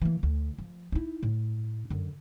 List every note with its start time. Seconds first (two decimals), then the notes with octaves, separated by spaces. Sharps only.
0.02 E3 A#3
0.23 D2
0.58 F3
0.92 D#4 E4
1.23 A2
1.90 F#2 D3